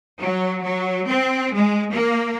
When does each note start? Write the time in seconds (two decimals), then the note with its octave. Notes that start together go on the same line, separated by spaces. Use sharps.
0.20 F#3
0.63 F#3
1.07 C4
1.53 G#3
1.92 A#3